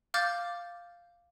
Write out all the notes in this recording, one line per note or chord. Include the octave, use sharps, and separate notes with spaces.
F5 D6 F6 G6 A6